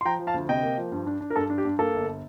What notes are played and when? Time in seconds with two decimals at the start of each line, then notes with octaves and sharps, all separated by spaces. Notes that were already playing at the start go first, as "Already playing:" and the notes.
0.01 C6
0.05 F3 G5 A#5
0.19 F3
0.27 F5 A5
0.34 D2
0.49 C3 D#5 G5
0.63 A#3
0.77 F3
0.92 G2
1.07 D4
1.21 D4
1.30 A#4
1.36 G2 A4
1.50 D4
1.58 G4
1.65 G2
1.79 A#3 A4
1.94 G1